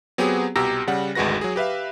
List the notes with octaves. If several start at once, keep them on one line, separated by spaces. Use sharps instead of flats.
F#3 B3 C4 G4 G#4
C2 B2 G4 A#5 E6 A#6
C#3 G3 F#5
G#1 D2 G#3 F#4 B4 A#6
F#3 G#4
G4 B4 E5 F5